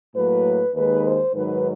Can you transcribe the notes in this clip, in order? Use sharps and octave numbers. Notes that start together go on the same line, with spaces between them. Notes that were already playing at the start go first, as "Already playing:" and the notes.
A2 F#3 A#3 B4
D#2 D#3 G#3 B4
C5
G#2 D#3 F#3 B4